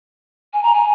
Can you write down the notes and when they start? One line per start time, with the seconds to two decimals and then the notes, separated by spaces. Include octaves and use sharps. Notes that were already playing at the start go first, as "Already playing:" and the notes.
0.53 G#5
0.63 A#5
0.74 G#5